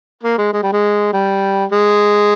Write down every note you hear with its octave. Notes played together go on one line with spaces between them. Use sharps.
A#3
G#3
G#3
G3
G#3
G3
G#3